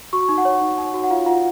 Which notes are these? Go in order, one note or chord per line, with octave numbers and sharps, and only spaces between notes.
F#4 C#6
D#4
F#5
C#5
D#4
D#4
F#4
F#5
F4 F5
F4 F#5